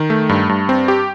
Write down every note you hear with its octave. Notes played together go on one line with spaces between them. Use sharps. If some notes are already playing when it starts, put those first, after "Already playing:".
Already playing: D#3
A3
G2
G2
C4
G4